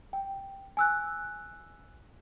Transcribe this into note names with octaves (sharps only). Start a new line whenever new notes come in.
G5
G#5 E6 F#6